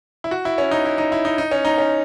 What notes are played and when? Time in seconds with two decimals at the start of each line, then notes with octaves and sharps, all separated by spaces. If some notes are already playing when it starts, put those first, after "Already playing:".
0.24 E4
0.31 F#4
0.45 E4
0.58 C#4
0.71 D#4
0.85 E4
0.98 D#4
1.12 E4
1.25 D#4
1.38 D#4
1.51 C#4
1.65 D#4
1.78 C#4